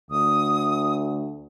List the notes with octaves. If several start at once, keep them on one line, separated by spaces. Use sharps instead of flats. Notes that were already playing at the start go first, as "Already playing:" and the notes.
D2 D#6